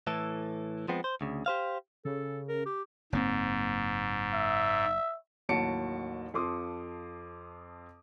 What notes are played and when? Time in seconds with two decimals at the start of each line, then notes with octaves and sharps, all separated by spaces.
0.07 A2 E3 A4
0.88 F3 G#3 B3 C4
1.04 C5
1.21 D2 C#3
1.46 G4 C5 F5
2.05 C#3 A4
2.48 A#4
2.66 G4
3.13 F#1 G#2 A#3 C4
4.34 E5
5.49 A1 D#2 F#3 A5 C#7 D7
6.34 F2 F3 C6 D6 D#6